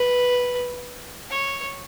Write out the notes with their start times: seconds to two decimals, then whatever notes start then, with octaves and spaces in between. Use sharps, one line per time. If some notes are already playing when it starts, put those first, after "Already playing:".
Already playing: B4
1.30 C#5